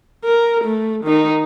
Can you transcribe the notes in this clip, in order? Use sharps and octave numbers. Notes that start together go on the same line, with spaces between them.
A#4
A3
D#3 D#4